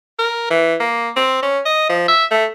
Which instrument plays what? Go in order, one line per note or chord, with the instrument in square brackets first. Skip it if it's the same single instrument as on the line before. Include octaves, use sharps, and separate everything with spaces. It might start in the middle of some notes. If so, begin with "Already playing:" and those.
[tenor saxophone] A#4
E3
A#3
C4
C#4
D#5
F3
E5
A3